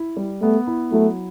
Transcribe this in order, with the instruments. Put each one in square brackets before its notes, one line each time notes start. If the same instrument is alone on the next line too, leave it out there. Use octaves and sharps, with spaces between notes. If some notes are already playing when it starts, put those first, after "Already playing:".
Already playing: [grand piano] E4
G3
[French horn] A3 [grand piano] B3
[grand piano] E4
[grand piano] F#3 [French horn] A3